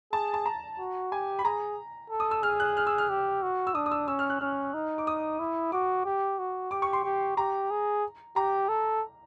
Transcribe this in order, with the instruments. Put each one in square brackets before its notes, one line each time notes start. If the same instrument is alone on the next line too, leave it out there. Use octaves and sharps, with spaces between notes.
[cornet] G#4 [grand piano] A5
[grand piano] A5
A#5
[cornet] F#4
[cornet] G4 [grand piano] G#5
[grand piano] B5
[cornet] G#4 [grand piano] A#5
[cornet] A4
[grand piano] D#6
E6
[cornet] G#4 [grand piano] F6
[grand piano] F#6
F6
E6
F6
[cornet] G4
F#4
[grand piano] E6
[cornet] D4 [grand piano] D#6
[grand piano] D#6
E6
[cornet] C#4 [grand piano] E6
[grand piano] F6
F#6
[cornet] C#4 [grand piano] F6
[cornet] D#4
[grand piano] D6
D#6
[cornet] E4
[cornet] F#4 [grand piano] D6
[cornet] G4
F#4
[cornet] G4 [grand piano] D6
[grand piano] C#6
C6
[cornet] G4
[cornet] G4 [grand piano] A#5
[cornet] G#4
[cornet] G4 [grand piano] A#5
[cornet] A4